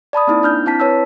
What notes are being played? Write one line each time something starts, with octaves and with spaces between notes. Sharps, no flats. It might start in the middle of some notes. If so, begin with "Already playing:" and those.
D5 A5 B5 D#6
A#3 C4 D#4 E4
D4 F6 G6
C4 E4 A5 B6
B4 C#5 A5 E6